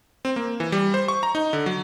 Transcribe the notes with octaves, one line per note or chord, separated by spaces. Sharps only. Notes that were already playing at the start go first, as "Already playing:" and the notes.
C4
A#3
E3
G3
C5
C#6
A#5
D#4
D3
F#3